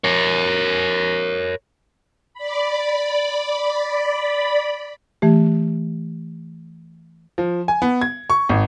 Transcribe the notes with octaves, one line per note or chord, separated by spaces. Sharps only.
A#4 C#5
D5 B5
E3 A3 G4
F3
G#5
B3
G#6
C#6
G#1